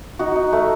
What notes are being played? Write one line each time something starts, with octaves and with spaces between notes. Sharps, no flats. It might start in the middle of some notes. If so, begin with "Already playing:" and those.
D#4 F#4
D#4
A3